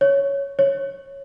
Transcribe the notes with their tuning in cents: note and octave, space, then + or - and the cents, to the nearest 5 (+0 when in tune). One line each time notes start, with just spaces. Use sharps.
C#5 +5
C#5 -10